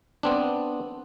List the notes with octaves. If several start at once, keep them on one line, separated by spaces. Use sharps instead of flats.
B3 C4 D4